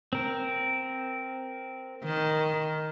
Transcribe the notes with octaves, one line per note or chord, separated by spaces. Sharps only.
C4 A#4
D#3